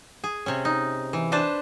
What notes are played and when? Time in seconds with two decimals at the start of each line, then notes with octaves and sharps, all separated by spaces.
0.24 G#4
0.46 C3 C#4
0.65 D#4
1.13 E3
1.32 D4 B4 C5 A5